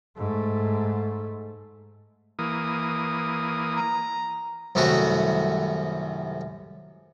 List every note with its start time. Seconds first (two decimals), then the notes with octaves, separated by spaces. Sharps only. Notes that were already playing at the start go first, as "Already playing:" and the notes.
0.18 G#2 A3
2.39 E3 A#3 D#6
3.76 A#5
4.75 C2 F#2 D#3 A3 F#4